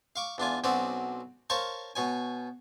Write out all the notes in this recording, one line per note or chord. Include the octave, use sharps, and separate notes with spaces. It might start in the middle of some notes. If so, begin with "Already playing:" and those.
F5 C#6 D6
E2 D4 F4 G#5
B1 F#3 C4 C#4 D5 F#5
A#4 C5 C#5 F5 A5 C#6
B2 C#5 G#5